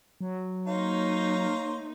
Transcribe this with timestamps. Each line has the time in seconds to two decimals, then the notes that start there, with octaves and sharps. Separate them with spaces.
0.21 F#3
0.67 A#3 D#4 C5 C#5 F5 A#5